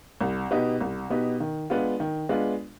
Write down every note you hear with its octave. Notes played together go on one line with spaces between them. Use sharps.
C2
B2 B3 D#4 G4
C2
B2 B3 D#4 G4
D#3
G#3 B3 D4 F4
D#3
G#3 B3 D4 F4